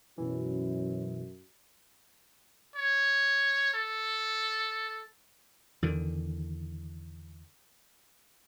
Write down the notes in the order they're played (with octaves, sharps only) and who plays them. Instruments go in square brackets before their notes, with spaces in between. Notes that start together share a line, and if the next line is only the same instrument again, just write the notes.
[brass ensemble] F#2 [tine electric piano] B2 E3
[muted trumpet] C#5
A4
[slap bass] E2 D3 D#3